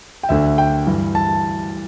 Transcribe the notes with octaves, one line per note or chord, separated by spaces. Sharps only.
G5
D2 D3 E5
G5
G2 E3
A5